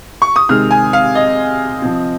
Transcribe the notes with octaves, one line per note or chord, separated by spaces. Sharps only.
C#6
D#6
C3 D#3 G#3 C4 F6
G#5
F5
D#5
F3 C4